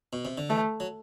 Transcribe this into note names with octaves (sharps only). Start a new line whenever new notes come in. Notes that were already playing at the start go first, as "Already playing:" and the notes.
B2
C3
D3
E3 A3
F#3